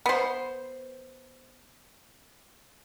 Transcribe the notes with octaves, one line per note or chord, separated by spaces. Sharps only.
B3 C5